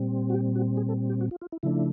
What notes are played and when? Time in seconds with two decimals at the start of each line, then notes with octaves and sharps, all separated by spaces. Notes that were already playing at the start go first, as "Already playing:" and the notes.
Already playing: A#2 G3 C4
0.30 F#4
0.34 G4
0.55 F#4
0.77 G#4
0.89 A4
1.10 G4
1.21 F#4
1.31 F4
1.41 F4
1.52 E4
1.63 C#3 F3 A3 D4 E4